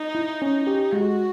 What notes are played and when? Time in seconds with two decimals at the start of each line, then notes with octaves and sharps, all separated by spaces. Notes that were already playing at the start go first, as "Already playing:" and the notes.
Already playing: D#4
0.15 E4
0.42 C#4
0.67 G4
0.92 G#3 F#4